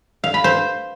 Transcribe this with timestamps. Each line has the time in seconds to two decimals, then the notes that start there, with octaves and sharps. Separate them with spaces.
0.24 F5
0.34 B5
0.44 C5